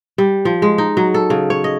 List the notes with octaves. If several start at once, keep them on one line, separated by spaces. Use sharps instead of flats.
G3
F3
G#3
D#4
F#3
A4
C#3
C#5
D#5